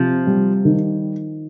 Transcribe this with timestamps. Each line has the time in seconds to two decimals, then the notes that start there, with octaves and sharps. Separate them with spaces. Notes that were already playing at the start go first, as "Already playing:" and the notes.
Already playing: C3 F3
0.27 G3
0.65 D#3